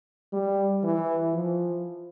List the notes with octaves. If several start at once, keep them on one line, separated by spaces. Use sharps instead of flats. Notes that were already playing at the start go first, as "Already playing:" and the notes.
G3
E3
F3